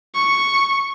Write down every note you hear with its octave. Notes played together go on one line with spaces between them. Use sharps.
C#6